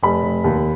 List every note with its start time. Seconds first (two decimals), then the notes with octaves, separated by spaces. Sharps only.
0.03 F1 B5
0.23 F1
0.44 D#2